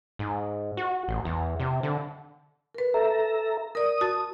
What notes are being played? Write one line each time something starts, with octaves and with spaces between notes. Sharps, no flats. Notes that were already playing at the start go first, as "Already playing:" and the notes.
G#2
F#4
A1
E2
C3
D3
A#4 B4
A4 E5 A#5
A#4 D5 D#6
F#4 A5 A6